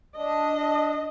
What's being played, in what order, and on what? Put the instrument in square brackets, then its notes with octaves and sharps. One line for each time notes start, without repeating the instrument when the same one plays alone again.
[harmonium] D4 [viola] D#5